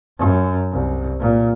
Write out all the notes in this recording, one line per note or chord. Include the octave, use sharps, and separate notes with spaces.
F#2
C2
A#2